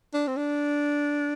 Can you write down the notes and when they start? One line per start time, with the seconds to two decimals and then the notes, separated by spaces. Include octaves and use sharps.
0.14 D4
0.28 C4
0.37 D4